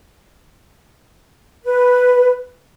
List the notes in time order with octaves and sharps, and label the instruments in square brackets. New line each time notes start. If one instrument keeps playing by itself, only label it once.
[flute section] B4